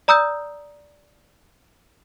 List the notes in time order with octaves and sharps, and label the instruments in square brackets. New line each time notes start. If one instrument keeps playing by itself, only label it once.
[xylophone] D5 A#5 D#6 E6 G6